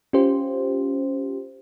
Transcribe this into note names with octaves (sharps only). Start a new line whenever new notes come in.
C#4 F4 G4 C5